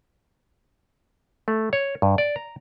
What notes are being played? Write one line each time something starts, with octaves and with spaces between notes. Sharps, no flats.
A3
C#5
G2
D5
A#5